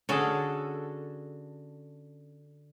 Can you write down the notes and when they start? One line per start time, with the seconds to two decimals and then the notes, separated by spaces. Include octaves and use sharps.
0.09 D3 C#4 F#4 G#4 A4